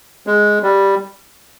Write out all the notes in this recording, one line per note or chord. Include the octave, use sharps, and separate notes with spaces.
G#3
G3